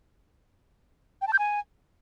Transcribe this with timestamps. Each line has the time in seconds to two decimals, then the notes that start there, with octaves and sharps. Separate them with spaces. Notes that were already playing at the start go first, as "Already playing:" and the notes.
1.22 G5
1.27 A5
1.33 G6
1.39 G#5